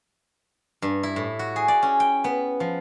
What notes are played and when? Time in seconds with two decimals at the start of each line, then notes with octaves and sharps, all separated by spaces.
0.82 G2
1.03 E4
1.16 A2
1.39 F#4
1.56 G#4
1.68 D5
1.83 C#4
2.00 G5
2.24 B3
2.60 F3